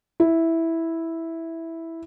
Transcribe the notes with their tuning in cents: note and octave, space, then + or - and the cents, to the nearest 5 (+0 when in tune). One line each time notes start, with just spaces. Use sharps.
E4 -5